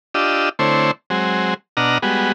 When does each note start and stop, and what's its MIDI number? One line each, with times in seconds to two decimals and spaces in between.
0.14 0.49 62
0.14 0.49 65
0.14 0.49 67
0.14 0.49 75
0.14 0.49 88
0.59 0.91 50
0.59 0.91 57
0.59 0.91 60
0.59 0.91 64
0.59 0.91 72
0.59 0.91 73
1.10 1.54 54
1.10 1.54 56
1.10 1.54 60
1.77 1.98 47
1.77 1.98 62
1.77 1.98 75
1.77 1.98 78
1.77 1.98 82
1.77 1.98 89
2.02 2.32 55
2.02 2.32 56
2.02 2.32 59
2.02 2.32 66